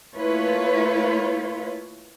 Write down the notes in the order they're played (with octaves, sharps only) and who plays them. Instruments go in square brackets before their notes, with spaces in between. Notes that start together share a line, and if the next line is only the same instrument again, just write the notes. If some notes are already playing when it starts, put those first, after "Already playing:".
[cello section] A3 A#3 E4 F4 B4 C#5